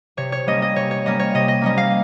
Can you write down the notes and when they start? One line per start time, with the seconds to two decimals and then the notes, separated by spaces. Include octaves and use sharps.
0.17 C3 C#5
0.32 C#5
0.47 G3 A#3 C#4 D#5
0.62 D#5
0.75 C3 C#5
0.91 C#5
1.06 G3 A#3 C#4 D#5
1.19 C#5
1.34 C3 D#5
1.48 D#5
1.61 G3 A#3 C#4 D#5
1.77 F5